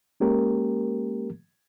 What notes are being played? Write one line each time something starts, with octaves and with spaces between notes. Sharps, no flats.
G#3 A#3 C#4 G4 A#4